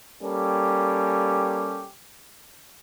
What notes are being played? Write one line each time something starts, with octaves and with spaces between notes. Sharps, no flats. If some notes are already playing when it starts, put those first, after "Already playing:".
G3 A#3 C#4 G4 A4